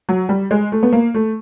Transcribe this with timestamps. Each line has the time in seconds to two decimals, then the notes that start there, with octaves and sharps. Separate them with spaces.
0.09 F#3
0.29 G3
0.51 G#3
0.72 A3
0.83 B3
0.93 A#3
1.14 A3